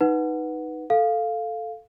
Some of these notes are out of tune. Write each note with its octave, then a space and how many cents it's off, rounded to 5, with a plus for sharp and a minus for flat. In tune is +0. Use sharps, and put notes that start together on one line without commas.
D#4 +5 B4 +0 F#5 +0
A4 +0 F5 +0